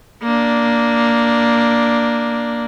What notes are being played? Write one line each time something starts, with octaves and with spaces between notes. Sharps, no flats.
A#3 D4